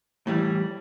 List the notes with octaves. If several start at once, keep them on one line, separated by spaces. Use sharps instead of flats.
A2 E3 G3